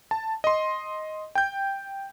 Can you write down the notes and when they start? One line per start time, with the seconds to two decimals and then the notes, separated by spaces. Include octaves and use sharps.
0.11 A5
0.44 D#5 C6
1.35 G5 G6